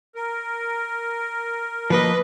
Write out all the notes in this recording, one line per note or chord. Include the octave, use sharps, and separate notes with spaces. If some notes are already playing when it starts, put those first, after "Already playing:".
A#4
F3 A#3 B4 D#5